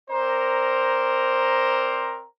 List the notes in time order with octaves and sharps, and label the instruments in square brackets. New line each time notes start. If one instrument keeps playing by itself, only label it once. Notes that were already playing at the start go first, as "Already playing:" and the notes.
[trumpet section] C4 A#4 C5 D5 A#5